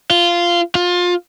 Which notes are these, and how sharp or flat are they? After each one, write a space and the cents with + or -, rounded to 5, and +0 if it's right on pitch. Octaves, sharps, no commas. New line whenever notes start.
F4 -10
F4 +25